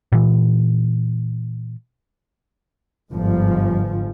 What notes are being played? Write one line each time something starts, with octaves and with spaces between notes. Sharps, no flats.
A#2 E3
G1 G#2 F3